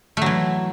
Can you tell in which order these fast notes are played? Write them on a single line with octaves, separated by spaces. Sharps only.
A3 F#3 E3